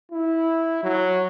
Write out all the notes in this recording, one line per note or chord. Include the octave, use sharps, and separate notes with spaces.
E4
F#3